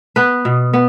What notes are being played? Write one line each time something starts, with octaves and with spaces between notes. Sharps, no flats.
B3 B4
B2
B3